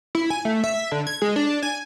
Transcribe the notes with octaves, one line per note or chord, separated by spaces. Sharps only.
E4
G#5
A3
E5
D3
G#6
G#3
D4
G#5